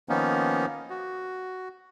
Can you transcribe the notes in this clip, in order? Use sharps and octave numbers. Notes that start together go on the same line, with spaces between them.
D#3 F3 A#3 B3 C#4 D#4
F#4